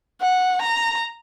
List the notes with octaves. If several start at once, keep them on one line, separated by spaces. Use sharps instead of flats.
F#5
A#5